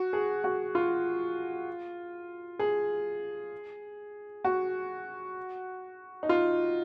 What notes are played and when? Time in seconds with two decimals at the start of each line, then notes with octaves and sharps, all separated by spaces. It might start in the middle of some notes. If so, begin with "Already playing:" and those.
Already playing: F#4
0.13 G#4
0.44 F#4
0.75 F4
2.59 G#4
4.45 F#4
6.23 D#4
6.29 F4